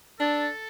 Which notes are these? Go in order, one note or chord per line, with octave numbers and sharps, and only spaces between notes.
D4 A4